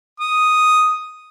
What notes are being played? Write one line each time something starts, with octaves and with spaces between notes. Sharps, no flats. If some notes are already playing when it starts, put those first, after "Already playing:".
D#6